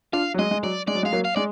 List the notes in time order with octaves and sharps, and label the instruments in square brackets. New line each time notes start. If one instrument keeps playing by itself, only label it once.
[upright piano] D4 F4 [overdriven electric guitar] F5
[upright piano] F#3
[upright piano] G#3 [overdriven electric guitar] D#5
[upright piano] G#3
[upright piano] F#3 [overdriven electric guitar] D5
[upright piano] G#3 [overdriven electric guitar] D5
[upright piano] F#3
G#3
[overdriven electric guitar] F5
[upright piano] F#3 A#3
[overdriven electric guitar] F5
[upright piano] G#3 [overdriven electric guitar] D5